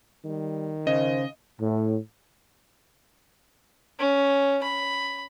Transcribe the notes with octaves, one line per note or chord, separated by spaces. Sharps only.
D#3 G3
C#3 C5 D#5
A2
C#4
B5